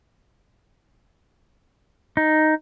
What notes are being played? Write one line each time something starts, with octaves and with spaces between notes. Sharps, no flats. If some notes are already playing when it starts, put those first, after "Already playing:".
D#4